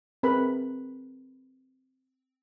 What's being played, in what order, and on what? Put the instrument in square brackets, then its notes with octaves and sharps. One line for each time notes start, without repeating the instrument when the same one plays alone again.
[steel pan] C4 G#4 A#4 B4 B5